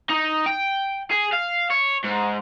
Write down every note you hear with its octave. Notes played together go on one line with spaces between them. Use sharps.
D#4
G5
G#4
F5
C#5
G#2